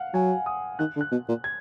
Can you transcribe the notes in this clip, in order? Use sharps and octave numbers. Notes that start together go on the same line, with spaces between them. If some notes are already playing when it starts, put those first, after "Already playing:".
Already playing: F5 F#5
F#3 G#5
D#6
D#3 F#6
D3
F#6
B2
A#2
G#6